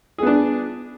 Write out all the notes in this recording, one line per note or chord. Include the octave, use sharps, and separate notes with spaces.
B3 D4 G#4